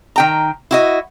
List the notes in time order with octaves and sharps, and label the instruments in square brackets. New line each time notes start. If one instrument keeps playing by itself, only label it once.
[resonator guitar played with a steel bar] D#3 G5 A#5
E4 F#4 D#5